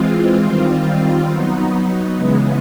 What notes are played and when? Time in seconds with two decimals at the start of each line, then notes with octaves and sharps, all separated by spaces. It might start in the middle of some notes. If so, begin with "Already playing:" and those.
Already playing: E3 G#3 C4 F4
0.42 D#3 G3 C4 F4
1.29 F#3 B3 D#4
2.16 C#3 E3 G#3 B3